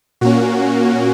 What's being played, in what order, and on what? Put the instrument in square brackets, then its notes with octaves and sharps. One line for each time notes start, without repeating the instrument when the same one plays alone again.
[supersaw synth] A#2 A#3 C#4 F#4